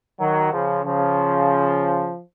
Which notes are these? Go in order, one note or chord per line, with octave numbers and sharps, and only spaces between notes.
D#3 F#3
C#3 F3
C#3 F3